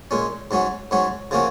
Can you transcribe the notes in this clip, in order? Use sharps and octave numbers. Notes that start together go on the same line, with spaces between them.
A#2 G#3 C#4
G#2 F#3 C#4 F#4
G#2 F#3 C#4 F#4
C#3 F3 A#3 C#4 F#4